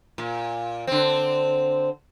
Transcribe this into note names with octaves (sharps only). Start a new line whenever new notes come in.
A#2
D3 C4